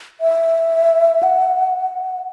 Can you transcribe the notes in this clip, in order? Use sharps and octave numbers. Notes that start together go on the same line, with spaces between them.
E5
F#5